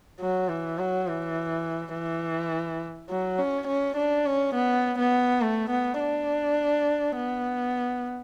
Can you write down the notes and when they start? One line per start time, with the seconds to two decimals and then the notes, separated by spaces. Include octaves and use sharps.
0.20 F#3
0.49 E3
0.79 F#3
1.08 E3
1.94 E3
3.10 F#3
3.39 C#4
3.68 C#4
3.97 D4
4.26 C#4
4.55 B3
4.99 B3
5.42 A3
5.70 B3
6.00 D4
7.16 B3